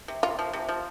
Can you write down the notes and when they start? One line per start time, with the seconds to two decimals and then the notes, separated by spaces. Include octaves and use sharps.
0.08 C3
0.23 C3 F4
0.39 F3
0.53 C3
0.69 F3